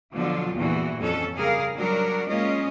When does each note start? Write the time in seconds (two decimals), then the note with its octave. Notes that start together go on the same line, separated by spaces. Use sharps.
0.13 B2 D3 F3 F#3 F4
0.53 E2 G2 A#2 E3 F#4
1.00 F2 C#4 A4
1.36 C#3 G3 G#4 A#4 F5
1.75 F#3 G3 D4 F#4 A#4
2.27 G#3 A#3 C#4 F4 D#5